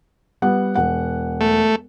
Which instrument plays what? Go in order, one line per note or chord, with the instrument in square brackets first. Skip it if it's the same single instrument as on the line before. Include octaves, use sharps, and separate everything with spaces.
[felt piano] G3 B3 F#5
E1 F#5
[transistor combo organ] A3